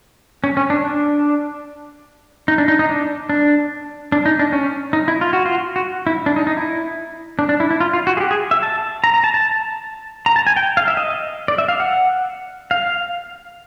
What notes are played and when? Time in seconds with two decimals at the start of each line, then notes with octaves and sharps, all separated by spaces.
0.44 C#4
0.57 C#4
0.70 D4
0.85 D4
2.48 D#4
2.58 D4
2.68 D#4
2.79 D#4
2.89 D4
3.29 D4
4.12 D4
4.26 D#4
4.39 D4
4.53 C#4
4.93 D#4
5.08 E4
5.21 F4
5.33 F#4
5.46 F4
5.76 F#4
6.07 E4
6.26 D4
6.36 D#4
6.47 D#4
6.57 E4
7.39 D4
7.49 D4
7.60 E4
7.71 E4
7.81 F4
7.93 F4
8.07 F#4
8.17 G#4
8.21 G4
8.31 G#4
8.51 E5
8.63 A5
9.04 A#5
9.14 A#5
9.24 A5
9.34 A5
10.26 A#5
10.36 A5
10.47 G#5
10.56 G5
10.77 F5
10.88 E5
10.97 D#5
11.48 D5
11.58 E5
11.68 F5
11.80 F#5
12.71 F5